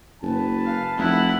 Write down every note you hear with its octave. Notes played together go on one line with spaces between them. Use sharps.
F#1 B4 G#5 A5
F5
F1 E4 F#5